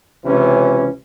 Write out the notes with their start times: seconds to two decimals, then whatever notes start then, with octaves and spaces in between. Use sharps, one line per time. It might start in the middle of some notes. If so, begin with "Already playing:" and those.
0.24 C#2 C3 E3 C#4